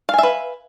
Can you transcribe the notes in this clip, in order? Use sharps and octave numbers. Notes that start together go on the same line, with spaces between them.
B4 E5 F5 G#5